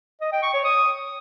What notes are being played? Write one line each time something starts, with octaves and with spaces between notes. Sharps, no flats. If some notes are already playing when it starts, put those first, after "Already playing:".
D#5
G5
C#6
C#5
D#6